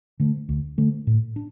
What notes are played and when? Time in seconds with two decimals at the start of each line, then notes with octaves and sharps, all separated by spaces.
0.20 D3 A3
0.49 D2
0.78 D3 A3
1.07 A2
1.36 D4